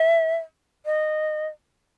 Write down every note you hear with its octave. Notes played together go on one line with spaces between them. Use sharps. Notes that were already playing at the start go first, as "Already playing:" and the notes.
Already playing: E5
D#5